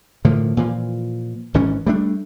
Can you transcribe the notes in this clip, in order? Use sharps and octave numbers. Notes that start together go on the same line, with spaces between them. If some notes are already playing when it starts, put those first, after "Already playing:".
A2 D3 D#3 F3
A#2 E3 F3
G#1 G#2 E3 C#4
G3 A3 D4